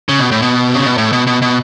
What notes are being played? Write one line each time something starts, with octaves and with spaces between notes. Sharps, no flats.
C#3
B2
A2
B2
C#3
B2
A2
B2
B2
B2